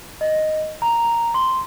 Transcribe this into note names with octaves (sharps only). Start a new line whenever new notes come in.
D#5
A#5
C6